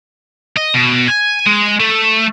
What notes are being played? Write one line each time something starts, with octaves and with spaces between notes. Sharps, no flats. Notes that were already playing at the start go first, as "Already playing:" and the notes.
D#5
B2
G#5
G#3
A3